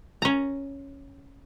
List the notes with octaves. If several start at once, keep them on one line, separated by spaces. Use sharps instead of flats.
C#4 A#5